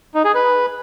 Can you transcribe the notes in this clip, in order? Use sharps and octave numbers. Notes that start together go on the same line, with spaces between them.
D#4
G#4
B4